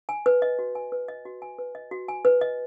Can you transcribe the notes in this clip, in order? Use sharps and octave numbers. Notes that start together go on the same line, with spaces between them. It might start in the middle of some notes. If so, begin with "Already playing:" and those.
G#5
B4
D#5
F#4
G#5
B4
D#5
F#4
G#5
B4
D#5
F#4
G#5
B4
D#5